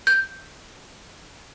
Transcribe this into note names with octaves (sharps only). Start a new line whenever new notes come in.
G6